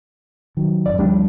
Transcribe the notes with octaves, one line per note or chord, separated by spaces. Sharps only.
D#3 F#3
G#1 F#2 D5
D2 F3 G3 D4